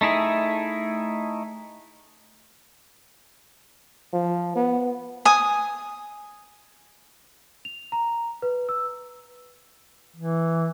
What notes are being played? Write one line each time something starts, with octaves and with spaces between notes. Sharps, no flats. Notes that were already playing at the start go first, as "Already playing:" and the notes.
A3 D#4 E4 G#4
F3
B3
G#5 D#6
F7
A#5
B4
E6
E3